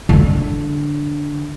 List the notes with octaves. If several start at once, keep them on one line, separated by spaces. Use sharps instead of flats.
D3 D4